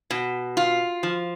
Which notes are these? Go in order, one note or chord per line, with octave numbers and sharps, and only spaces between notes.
B2
F4
F3